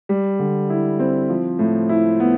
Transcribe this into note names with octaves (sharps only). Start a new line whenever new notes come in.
G3
D3
E4
C4
F3
A2
E4
B3